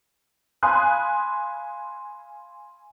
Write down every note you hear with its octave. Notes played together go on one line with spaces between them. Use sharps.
F5 G#5 B5 C6 D#6 F#6